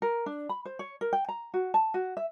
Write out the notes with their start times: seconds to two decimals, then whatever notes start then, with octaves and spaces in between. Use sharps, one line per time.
0.02 A#4
0.26 D4
0.49 B5
0.65 C5
0.79 C#5
1.01 A#4
1.13 G5
1.29 A#5
1.54 F#4
1.74 A5
1.94 F#4
2.17 E5